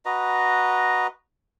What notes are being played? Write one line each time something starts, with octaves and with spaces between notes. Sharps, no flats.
F#4 B4 D#5 A#5